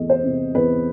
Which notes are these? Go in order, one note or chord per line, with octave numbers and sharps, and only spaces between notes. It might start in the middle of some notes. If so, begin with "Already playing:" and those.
Already playing: E2 C3 A3 D#5
C5
C3
E2 B4